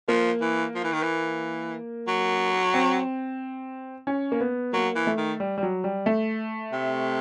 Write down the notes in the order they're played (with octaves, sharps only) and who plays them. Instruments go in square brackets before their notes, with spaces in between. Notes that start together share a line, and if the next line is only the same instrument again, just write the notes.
[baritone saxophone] F3 [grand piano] A#3
[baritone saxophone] E3
F3
E3
D#3
E3
F#3
[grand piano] C4
C#4
A#3
B3
[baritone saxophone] F#3 [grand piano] A#3
[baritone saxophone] E3
[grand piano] A3
[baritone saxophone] D#3
[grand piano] G3
G3
F#3
G3
A3
[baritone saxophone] C3